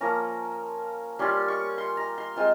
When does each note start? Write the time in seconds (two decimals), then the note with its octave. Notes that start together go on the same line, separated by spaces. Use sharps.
0.01 F3 A#3 C#4 A#5
1.19 G3 C#4 F4 C6
1.48 C#6
1.78 C6
1.97 A#5
2.18 C6
2.36 G#3 C4 F4 C6